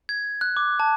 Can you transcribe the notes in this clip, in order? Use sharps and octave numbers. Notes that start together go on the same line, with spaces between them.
G#6
F#6
D6
A5